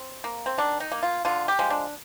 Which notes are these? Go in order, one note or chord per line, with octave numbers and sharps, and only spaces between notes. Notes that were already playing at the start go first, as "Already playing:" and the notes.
Already playing: C4
A#3
C4
D#3 D4
D#4
A#3
F4
D3 F4
G4
F3 G#3
D4